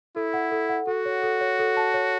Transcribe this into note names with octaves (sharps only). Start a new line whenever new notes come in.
E4 A4
F#5
A4
F#5
F#4 A4
C#5
A4
C#5
A4
A5
C#5